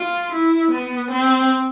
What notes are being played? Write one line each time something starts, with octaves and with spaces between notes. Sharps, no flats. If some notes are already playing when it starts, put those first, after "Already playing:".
Already playing: F4
E4
B3
C4